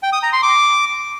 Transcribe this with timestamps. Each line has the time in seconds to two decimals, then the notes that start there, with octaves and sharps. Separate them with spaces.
0.03 G5
0.13 D#6
0.23 A#5
0.33 C6
0.43 D6